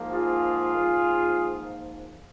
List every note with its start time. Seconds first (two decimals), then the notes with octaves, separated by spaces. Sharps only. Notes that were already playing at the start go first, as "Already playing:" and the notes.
Already playing: G#2 F3 A#3
0.13 F4 G#4
0.76 G#2 F3 A#3